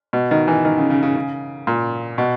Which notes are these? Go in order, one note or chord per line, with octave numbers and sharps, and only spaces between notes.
B2
D#3
E3
D#3
C#3
C#3
C#3
C#3
A#2
B2